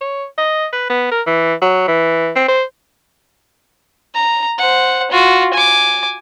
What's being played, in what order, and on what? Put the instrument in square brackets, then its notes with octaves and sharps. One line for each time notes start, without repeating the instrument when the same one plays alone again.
[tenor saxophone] C#5
D#5
B4
B3
A#4
E3
F#3
E3
C4
C5
[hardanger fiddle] A#5
C5 F#5
F4 F#4
G#5 D6